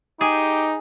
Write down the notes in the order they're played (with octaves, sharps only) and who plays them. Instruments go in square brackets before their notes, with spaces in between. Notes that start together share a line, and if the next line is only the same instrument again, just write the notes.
[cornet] D#4 [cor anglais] G4 [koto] G#4